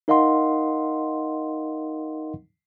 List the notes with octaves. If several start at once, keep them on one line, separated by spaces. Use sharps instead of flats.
D#4 A#4 D#5 F5 F#5 C6